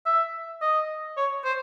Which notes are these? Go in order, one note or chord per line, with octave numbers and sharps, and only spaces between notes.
E5
D#5
C#5
C5